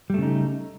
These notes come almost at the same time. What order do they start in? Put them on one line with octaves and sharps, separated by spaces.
G3 A3 C#3 D#4